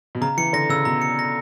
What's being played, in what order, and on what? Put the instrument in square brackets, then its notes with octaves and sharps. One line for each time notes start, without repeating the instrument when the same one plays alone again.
[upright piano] B2
[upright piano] C#3 [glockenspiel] A#5
[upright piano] E3 [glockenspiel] C#7
[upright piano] D3 [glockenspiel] A#6
[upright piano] C#3 [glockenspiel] E6
[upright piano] B2 [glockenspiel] A#5
[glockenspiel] C#7
A#6